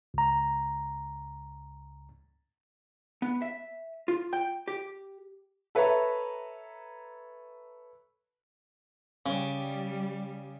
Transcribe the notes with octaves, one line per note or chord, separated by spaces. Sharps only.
C#2 A#5
B3
E5
F4
G5
G4
A4 B4 C#5 E5 A#5
C#3 G3